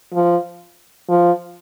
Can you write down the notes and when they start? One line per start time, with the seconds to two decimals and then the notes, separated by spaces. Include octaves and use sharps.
0.14 F3
1.09 F3